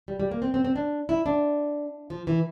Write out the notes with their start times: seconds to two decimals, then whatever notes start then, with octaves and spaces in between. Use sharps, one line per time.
0.08 G3
0.20 G3
0.31 A#3
0.42 C4
0.54 C4
0.65 C4
0.76 D4
1.09 E4
1.26 D4
2.10 F3
2.27 E3